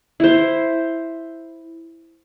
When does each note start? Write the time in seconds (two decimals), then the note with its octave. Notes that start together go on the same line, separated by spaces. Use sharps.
0.20 E4 C5